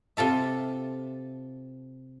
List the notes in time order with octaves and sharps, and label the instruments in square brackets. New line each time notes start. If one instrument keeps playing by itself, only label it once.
[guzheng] C3 F4 A4 E5